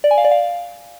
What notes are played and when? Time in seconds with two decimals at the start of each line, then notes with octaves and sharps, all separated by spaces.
0.04 D5
0.11 G#5
0.18 F5
0.25 D5
0.31 F5